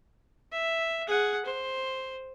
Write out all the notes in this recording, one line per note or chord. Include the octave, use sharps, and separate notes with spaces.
E5
G#4 F#5
C5